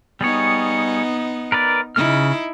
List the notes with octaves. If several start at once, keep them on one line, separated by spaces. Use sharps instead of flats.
G3 B3 D#4 G#4 C#5
A#4 B4 D5
C#3 D#4 E4 F6